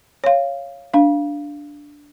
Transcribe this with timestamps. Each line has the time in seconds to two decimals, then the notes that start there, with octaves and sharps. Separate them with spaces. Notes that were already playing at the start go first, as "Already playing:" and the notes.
0.24 C#5 F5
0.94 D4 F5